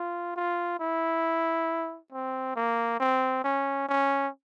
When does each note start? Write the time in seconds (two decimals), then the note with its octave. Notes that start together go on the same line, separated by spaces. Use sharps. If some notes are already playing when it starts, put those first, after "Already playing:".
Already playing: F4
0.36 F4
0.80 E4
2.13 C4
2.56 A#3
3.00 C4
3.44 C#4
3.89 C#4